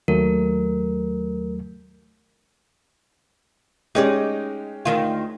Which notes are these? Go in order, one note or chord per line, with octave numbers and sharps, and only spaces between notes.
D#2 F#3 A3 A#4
G#3 C#4 D#4 G4 C#5 D5
D2 D#3 F4